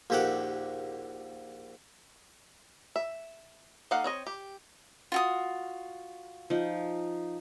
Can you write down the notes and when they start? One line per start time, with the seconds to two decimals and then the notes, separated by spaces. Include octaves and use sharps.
0.10 A#1 D#2 G4 A4 F#5 D6
2.96 E5
3.91 A#3 D#4 A4 F5 F#5
4.04 C4 C#5 D#5
4.27 G4
5.12 F4 F#4 D#6
6.50 F3 D#4